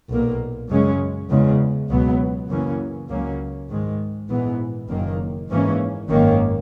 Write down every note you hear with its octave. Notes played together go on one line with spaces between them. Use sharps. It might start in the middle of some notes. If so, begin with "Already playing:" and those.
B1 A#2 A#3
F#2 C#3 G#3 C#4
E2 C#3 G#3
C#2 B2 F#3 B3
F#2 C#3 E3 A#3 C#4
C#2 C#3 F#3 A#3 C#4
G#2 D#3 G#3
A#1 G#2 E3 B3
F#1 F#2 D#3 A#3
G#1 G#2 E3 A#3 C#4
G#1 F#2 D#3 A#3 C#4